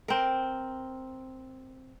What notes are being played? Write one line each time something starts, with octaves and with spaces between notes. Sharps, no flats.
C4 A#4